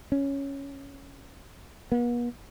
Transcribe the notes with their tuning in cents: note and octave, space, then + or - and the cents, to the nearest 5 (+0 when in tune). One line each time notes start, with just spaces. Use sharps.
C#4 +0
B3 -45